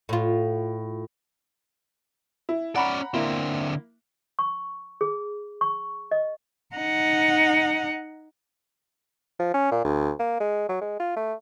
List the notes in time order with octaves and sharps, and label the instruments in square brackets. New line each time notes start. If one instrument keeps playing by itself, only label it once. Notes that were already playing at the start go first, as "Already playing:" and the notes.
[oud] A2 F4
[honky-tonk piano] E4
[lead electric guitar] C#4 D5 [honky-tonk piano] F#5 A#5 B5
[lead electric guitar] D3 C4 [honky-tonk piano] A#3 E4
[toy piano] C#6
G#4
C#6
D#5
[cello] D#4 F#5
[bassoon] F3
C#4
A#2
D2
A#3
G#3
F#3
G#3
F4
A3